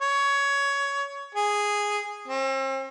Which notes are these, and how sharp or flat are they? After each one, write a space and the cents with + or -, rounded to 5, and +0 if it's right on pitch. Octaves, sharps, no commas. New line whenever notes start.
C#5 +15
G#4 -5
C4 +40